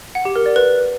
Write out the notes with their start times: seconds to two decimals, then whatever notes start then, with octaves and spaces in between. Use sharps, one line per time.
0.15 F#5
0.25 G4
0.36 A#4
0.46 D5
0.56 B4